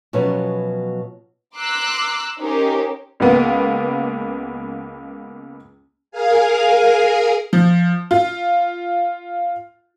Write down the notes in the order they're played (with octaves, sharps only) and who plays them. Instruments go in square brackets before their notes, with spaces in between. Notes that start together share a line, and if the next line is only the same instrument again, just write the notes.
[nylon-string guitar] B2 F3 F#3 B3 C#4
[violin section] A#5 C6 D6 E6 F#6
C#4 D#4 G4 A#4 C5
[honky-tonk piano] C#2 A#3 B3
[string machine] G#4 A#4 F5 G#5
[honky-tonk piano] F3
F4